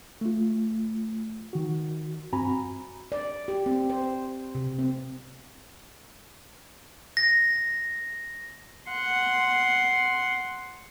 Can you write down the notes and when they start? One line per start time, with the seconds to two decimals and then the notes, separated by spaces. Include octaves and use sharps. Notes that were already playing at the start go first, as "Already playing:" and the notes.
0.21 A3 F4
1.53 D#3 F#4
2.33 G2 C4 F#4 G#5 A#5 B5
3.12 D5
3.48 G4
3.66 C4
3.90 C5
4.55 C3
4.79 C4
7.17 A#6
8.91 F#5 C6